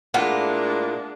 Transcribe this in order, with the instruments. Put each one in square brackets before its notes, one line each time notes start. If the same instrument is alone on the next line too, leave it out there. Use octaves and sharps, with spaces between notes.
[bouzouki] A2 F4 [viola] G#3 D4 [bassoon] A#3 [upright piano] F#5